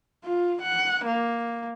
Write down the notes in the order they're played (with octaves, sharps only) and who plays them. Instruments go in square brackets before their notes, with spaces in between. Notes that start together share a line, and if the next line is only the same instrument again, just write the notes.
[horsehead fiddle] F4
F#5
A#3